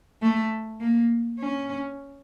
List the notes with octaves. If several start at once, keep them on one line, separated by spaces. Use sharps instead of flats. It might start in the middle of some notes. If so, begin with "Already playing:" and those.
A3
A#3
C#4